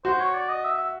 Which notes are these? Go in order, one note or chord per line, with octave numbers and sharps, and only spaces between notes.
F#4 C5
C#5
D5
D#5
E5
E5